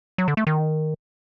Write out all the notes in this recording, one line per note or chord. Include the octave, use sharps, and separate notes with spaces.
F#3
D3
A3
D#3